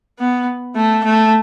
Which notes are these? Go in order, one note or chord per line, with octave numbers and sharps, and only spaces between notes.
B3
A3
A3